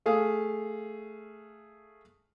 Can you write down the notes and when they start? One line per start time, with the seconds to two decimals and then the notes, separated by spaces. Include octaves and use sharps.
0.06 A3 G#4 F5